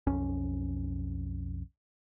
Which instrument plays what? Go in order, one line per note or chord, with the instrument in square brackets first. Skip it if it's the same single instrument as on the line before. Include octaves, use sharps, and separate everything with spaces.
[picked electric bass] B1 F2 C#4